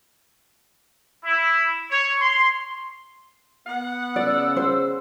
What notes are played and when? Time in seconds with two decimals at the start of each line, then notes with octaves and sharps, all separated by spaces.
1.24 E4
1.91 C#5
2.21 C6
3.67 B3 F#5
4.16 C#3 D5 E6
4.57 C5